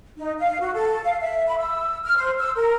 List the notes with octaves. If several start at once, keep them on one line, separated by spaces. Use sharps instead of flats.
D#4
F5
F#4
A4
F5
E5
B5
E6
F6
C5
E6
A#4